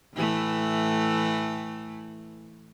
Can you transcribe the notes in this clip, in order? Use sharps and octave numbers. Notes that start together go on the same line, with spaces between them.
A2 E3 A3